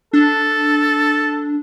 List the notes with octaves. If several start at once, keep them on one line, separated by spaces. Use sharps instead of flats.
D4 A4